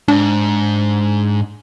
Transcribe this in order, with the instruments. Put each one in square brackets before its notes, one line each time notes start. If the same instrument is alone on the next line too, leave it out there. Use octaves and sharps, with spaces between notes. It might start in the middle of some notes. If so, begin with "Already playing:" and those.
[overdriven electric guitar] G#2 [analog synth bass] D4